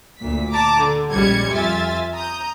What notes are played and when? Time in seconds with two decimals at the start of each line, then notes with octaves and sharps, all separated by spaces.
0.18 D2 A#2 B6
0.52 A5 A#5 D6
0.83 D3
1.12 A#1 G3 G#3 C#4 G#6 C#7
1.50 F2 F4 E5 G#5 A6
2.15 A#5 D#6 G6